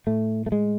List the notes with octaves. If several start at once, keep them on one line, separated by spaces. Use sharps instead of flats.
A2 A3
A3
G#3